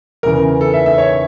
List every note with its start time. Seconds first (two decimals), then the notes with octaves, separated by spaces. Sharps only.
0.23 E2 C#3 E3 A#4
0.61 A4
0.74 E5
0.86 E5
0.98 C#5